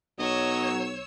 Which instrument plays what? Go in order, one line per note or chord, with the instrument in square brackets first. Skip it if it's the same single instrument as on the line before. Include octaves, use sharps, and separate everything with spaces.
[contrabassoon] B1 [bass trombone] F#3 [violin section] C#5 E6 [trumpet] D#5